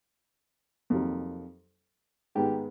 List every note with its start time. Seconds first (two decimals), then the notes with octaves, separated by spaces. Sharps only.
0.90 F2 C3 D#3 F#3 A#3
2.35 G#2 D#3 G#3 B3 G4